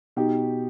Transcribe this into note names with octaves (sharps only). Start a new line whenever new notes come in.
B2 D#4 G4